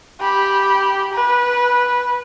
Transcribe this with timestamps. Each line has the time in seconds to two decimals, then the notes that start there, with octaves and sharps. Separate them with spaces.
0.20 G4 B5
1.13 B4